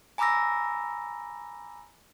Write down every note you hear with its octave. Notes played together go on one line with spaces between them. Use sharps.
G#5 A#5 B5 D6 E6 A#6